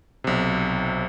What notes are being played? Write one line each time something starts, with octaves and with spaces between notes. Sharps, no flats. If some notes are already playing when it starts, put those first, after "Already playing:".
B1 C3